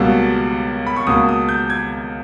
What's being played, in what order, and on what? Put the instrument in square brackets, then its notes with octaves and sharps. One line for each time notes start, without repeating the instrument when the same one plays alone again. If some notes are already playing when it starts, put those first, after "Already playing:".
Already playing: [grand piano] C#2 B2 G3 A#3 E6
B5
C#6
C#2 B2 A#3 D#6
D#6
G6
G#6